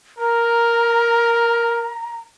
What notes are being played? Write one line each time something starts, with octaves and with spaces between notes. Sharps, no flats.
A#4 A#5